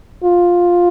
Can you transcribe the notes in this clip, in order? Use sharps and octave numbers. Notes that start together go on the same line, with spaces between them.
F4